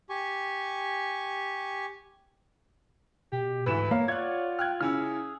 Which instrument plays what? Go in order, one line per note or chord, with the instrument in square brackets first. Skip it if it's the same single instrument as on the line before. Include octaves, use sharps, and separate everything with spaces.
[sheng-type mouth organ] G4 G#5 C#6
[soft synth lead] B2 [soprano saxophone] G4
[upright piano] D2 E3 E7 [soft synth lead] G#2 [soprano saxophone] B4
[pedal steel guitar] A#3 [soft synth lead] C#5 [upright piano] F5
[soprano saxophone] F4 [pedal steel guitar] D5 F#5 C#6 [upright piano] F#6 G#6
[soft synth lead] G5 [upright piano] F6 F#6 G#6
[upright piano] C#3 C#4 E6 [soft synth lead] E4 [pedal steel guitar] G#4 F6